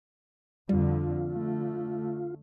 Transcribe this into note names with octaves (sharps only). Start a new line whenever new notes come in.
F2 D3 G3 F4
D3 A3